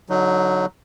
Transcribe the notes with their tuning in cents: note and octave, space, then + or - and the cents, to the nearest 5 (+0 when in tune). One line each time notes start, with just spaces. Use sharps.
D3 -30 F#3 +0 D#4 +0